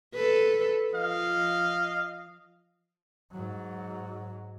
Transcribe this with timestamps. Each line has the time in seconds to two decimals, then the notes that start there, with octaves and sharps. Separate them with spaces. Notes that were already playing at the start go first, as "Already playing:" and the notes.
0.14 A4 B4
0.94 F3 D#5 F5
3.32 G#2 F#3